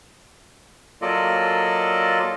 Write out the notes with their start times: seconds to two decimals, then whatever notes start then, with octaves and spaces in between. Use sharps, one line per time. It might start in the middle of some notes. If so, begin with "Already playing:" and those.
1.02 F#3 A#3 F4 A4 D5 D#5